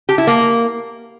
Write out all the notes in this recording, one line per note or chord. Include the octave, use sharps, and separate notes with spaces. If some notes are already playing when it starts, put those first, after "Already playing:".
G4
E4
A#3